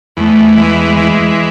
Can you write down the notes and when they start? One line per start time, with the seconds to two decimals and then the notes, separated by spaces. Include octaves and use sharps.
0.17 E2 A3
0.57 E3 G#3
0.97 E3